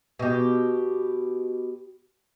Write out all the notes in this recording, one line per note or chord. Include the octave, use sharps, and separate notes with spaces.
B2 G4